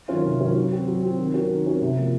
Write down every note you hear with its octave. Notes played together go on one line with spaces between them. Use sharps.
D#3 F#3 C#4 F4
C3
D#3 F#3 C#4 F4
F#3
C4 F#4
F#3
C4 F#4
D#3
F#3 C#4 F#4 A#4
D#3
F#3 C#4 F#4 A#4
C3
F3 A#3 C#4